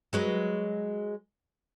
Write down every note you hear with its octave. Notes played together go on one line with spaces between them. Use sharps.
F#3 G#3 B4